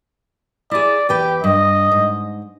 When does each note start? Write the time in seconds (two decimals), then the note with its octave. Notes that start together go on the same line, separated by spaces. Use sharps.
0.71 E4 G#4 D5
1.09 E2 G4 B4 G5
1.44 G2 D#5
1.92 G#2